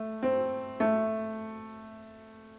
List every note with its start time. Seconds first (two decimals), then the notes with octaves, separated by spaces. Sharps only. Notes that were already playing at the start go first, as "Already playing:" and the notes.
Already playing: A3
0.23 C4
0.80 A3